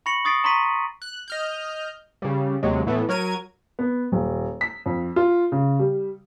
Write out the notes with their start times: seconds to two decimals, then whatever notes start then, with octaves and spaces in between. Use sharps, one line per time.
0.06 B5 C#6 A#6 C#7 F#7
0.25 C#6 D#6 A6 C7 D7
0.44 A#5 C6 C#6 B6 D#7
1.02 F#6
1.28 D#5 F6 G6
2.22 C#3 G3
2.63 D#2 C3 F#3 G#3
2.86 A2 E3 A3 B3
3.09 F#3 A#4 G#6 D#7
3.79 B3
4.12 D#1
4.61 B6
4.86 F2
5.16 F4
5.52 C#3
5.79 G3